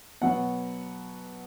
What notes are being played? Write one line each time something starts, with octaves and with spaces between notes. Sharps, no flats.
B2 F#3 B3 F#5